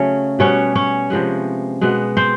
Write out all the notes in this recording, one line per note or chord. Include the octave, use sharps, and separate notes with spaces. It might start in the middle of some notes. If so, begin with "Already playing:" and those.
Already playing: C#3 F#3 A3 C#4 C#5
B2 G3 B3 C#4 C#5
C#4 C#5
C3 F3 G#3 B3
B2 G#3 B3
C4 C5